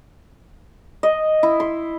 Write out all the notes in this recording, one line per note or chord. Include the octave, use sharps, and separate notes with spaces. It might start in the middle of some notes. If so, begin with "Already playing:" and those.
D#5
E4
C6